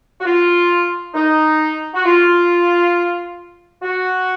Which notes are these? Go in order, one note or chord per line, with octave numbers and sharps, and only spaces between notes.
F#4
F4
D#4
F#4
F4
F#4